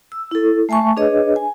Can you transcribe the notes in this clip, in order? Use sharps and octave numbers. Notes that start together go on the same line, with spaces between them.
E6
E4 A4
A3 E5 G#5 A5 C#6
D4 G#4 B4 C#5 D#5
G#5